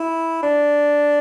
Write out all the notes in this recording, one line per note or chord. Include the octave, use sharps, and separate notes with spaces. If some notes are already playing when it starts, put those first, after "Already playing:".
Already playing: E4
D4